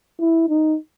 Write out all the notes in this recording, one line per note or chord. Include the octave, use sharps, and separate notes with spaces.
E4
D#4